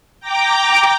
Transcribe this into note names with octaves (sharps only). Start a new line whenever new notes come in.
G5 A#5 D6